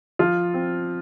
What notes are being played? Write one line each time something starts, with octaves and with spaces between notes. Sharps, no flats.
F3 F4
C4